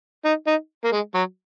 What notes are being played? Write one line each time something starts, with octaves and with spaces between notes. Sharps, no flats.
D#4
D#4
A#3
G#3
F#3